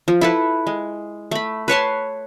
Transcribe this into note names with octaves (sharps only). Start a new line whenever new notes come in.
F3
E4 A4 B4
G#3
A3 B5
B4 C#5 A5 C6